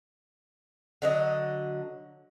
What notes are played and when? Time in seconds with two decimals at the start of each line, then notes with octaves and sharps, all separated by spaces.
1.02 D3 F#3 D#5